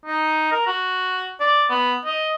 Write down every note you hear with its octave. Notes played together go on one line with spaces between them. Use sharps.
D#4
A#4
F#4
D5
B3
D#5